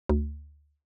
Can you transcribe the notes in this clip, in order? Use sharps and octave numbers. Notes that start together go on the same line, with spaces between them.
D2